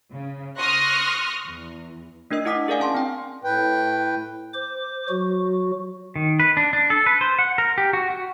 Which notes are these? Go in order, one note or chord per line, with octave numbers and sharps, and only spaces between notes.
C#3
C6 C#6 D#6 F6 F#6 A#6
E2
A3 D4 A#4 D#5 E6
D4 E4 F#5 D6 D#6 B6
G#4 A#4 D5 F5 G#5
C#4 A5 C6
C4 G5
A2 B4 G5
C5 D6
F#3 F#4
D#3
B4
D4
D4
A4
B4
C5
F#5
A#4
G4
F#4
F#4